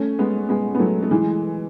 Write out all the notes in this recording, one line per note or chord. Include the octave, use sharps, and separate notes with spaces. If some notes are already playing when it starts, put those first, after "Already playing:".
Already playing: A3 C#4
G#3 B3
G#3 B3
B3
F#3 A3
A3
E3 G#3